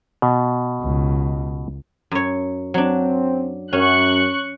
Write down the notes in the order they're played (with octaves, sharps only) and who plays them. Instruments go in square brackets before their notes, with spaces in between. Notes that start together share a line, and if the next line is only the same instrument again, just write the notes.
[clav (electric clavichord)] B2
[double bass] C#2
[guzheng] F#2 C#5
[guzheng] F#3 D4 [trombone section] C4
[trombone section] F#2 [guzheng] C#4 [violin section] C#6 F#6